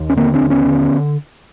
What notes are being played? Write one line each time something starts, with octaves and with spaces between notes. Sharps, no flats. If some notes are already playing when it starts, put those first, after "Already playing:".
Already playing: D#2
C#4
D3 A#3 C4
C4 D4
D#2
B3 C#4
D3